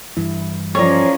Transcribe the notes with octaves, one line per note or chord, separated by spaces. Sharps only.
G2 E3 E4
F3 C#4 A4 C#5 D5 A#5